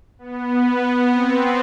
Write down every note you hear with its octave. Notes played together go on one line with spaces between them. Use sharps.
B3
C4